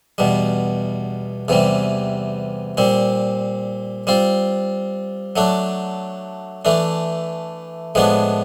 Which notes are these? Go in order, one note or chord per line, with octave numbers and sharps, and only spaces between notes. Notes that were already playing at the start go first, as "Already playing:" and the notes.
E2 B2 G3
E2 C3 E3 G3
A#2 G3 C4
G3 C4 F4
F#3 A3 D4
E3 A3 D4
A2 F3 G#3 B3 D4